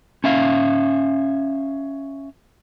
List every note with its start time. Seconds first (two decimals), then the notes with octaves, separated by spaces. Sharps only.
0.24 C#4 E5 F5